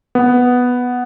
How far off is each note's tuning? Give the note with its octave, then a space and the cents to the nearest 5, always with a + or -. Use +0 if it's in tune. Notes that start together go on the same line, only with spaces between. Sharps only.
B3 +0